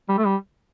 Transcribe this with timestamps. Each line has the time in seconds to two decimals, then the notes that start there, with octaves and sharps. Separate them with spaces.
0.09 G3
0.18 A3
0.26 G3